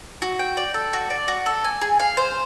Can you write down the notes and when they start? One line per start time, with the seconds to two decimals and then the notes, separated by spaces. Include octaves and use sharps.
0.22 F#4
0.39 G5
0.57 D5
0.74 A4
0.93 F#4
1.10 D5
1.28 F#4
1.46 A4
1.64 G#5
1.81 G#4
2.00 F5
2.17 C5